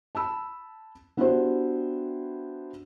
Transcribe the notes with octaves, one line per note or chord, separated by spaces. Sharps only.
A5 B5 E6
B3 D4 E4 F#4 G4 C5